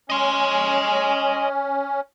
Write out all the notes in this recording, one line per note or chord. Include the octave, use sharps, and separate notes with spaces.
C#4 D#5 C6